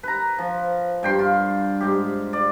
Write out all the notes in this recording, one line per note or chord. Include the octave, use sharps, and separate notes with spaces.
B4 A#5
F3
G2 G5 C6
F4
G#2 G4
D5